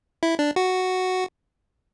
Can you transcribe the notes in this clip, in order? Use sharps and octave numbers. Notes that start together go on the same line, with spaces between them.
E4
D4
F#4